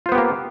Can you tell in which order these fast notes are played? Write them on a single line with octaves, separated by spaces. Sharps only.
F4 C5 B3 G4 A#3